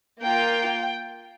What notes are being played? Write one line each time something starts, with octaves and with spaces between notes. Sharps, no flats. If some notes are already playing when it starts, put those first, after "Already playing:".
A#3 F4 G5